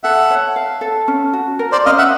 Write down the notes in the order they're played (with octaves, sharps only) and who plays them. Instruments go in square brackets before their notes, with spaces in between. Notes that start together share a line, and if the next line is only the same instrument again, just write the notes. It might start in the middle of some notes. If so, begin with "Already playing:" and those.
[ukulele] A4 [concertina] E5 F#5
[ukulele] C#5
F5
A4
C#4
F#4
A#4
[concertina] C5 D5
[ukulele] C#4 [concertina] D#5 F5
[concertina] E5 F#5